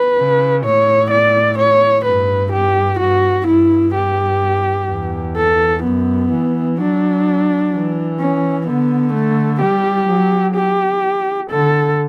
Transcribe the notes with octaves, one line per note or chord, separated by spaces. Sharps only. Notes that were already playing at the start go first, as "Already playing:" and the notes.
Already playing: B4
C#3
A2 C#5
D5
C#5
G2 B4
G4
G2 F#4
G2 E4
G4
E2
A4
F#2 B3
E3
F#3 D4
E3
C#4
D3 B3
A3
G3 G4
F#3
G4
D3 A4